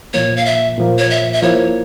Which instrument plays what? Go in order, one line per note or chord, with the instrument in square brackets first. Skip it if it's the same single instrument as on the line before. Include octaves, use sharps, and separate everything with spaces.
[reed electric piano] A#2 F3 A#3 [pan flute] C#5
[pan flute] F5
E5
[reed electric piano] A#2 F3 A#3
[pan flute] C#5
E5
E5
[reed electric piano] F3 A#3 E4 A#4 [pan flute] C#5